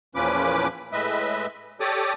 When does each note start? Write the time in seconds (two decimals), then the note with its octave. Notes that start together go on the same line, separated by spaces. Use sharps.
0.15 E2 A#2 F3 C#4 B4 D6
0.93 A2 G#3 B4 D#5 E5
1.80 G4 A4 C#5 D5 D6 D#6